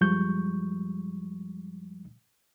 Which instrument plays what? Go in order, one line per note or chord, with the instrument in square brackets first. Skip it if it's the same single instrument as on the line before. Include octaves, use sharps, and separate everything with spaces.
[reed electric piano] F#2 F3 G3 G#3 C#6 G6